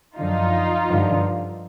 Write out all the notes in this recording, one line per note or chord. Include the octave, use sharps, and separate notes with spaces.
F#2 D3 F3 D#4 F4
G2 D3 F3